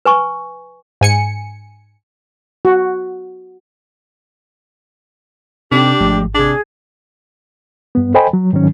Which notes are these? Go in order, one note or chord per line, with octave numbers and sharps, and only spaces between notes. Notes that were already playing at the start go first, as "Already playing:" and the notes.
B4 G#5 C#6
G#2 G#5 C#7
F#4
C3 C4 D4 D#4 G4 A4
G#1 F3 G#3 A3
C3 D4 G#4 A5
G2 B3
A4 C5 D#5 G5 G#5 B5
F#3
G#2 D#3 F#3 C#4